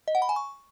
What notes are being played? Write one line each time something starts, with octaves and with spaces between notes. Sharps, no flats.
D#5
F#5
B5
G#5
C#6